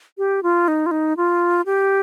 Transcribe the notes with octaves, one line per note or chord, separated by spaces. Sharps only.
G4
F4
D#4
F4
D#4
F4
G4